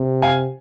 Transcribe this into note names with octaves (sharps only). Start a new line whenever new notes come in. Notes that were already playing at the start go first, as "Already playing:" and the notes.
Already playing: C3
F5 G#5